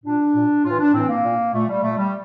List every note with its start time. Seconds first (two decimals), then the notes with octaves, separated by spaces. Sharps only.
0.05 A#2 D4
0.35 A#2
0.65 A2 E3 F4
0.80 D4
0.94 A2 E3 C4
1.09 A#3
1.23 A#2
1.53 A#2 A3
1.69 G3
1.83 A#2 A3
1.98 G3